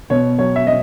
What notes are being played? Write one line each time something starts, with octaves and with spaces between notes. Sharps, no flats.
B2 C#5
F#3 C#5
E5
B2 D#5